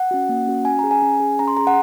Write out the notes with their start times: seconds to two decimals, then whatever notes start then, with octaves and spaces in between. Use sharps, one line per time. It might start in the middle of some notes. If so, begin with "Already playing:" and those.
Already playing: F#5
0.11 C#4 F#4
0.29 A#3
0.47 C#4 F#4
0.65 C#4 G#5
0.79 G#4 A#5
0.91 G#5
1.02 C#4
1.20 G#4
1.39 C#4 A#5
1.48 C6
1.57 G#4 A#5
1.67 F#5